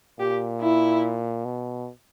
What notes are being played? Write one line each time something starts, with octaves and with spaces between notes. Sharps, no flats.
A#2 G4
E4
B2